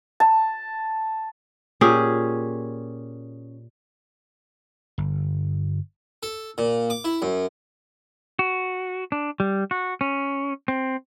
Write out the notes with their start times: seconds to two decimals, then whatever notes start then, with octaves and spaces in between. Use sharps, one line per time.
0.20 A5
1.81 A#2 C#4 G4 G#4
4.98 G1
6.23 A4
6.58 A#2
6.90 D6
7.04 E4
7.22 F#2
8.39 F#4
9.12 D4
9.40 G3
9.71 F#4
10.01 C#4
10.68 C4